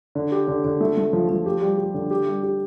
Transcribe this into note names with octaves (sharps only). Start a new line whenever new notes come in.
D3
G4
D3
D3
A3
A3
F3
F3
G4
G3
G4
D3
G4
G3
G4